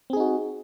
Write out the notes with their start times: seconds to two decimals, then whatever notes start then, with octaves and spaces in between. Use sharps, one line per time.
0.10 C4
0.13 G#4
0.17 D#4
0.20 F#4